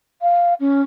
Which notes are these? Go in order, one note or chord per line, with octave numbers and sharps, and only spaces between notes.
F5
C#4